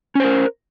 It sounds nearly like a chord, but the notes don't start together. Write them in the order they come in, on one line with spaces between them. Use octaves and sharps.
C#4 C5 A#4